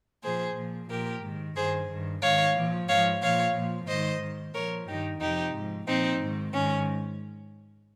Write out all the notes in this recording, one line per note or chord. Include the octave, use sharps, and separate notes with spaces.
A#2 F3 G#4 C5
A#2 F3
A#2 F3 G4 A#4
G#2 D#3
G2 D#3 G#4 C5
G2 D#3
G#2 D#3 C#5 F5
A#2 F3
G#2 F3 C#5 F5
A#2 F3 C#5 F5
A#2 F3
G#2 D#3 C5 D#5
G#2 D#3
A#2 F3 A#4 C#5
G2 D#3 D#4 G4
F2 C3 F3 D#4 G4
G#2 F3
A#2 F3 C4 D#4
G#2 D#3
G#2 D#3 C#4